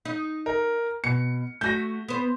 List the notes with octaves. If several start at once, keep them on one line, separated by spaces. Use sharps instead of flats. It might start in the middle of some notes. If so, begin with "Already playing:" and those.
D#4 D#5
A#4
B2 C#7
A3 F#4 G6 A#6
B3 C5